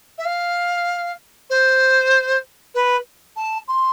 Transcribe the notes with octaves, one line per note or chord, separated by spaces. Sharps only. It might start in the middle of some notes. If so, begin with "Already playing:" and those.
E5
F5
C5
B4
A5
C6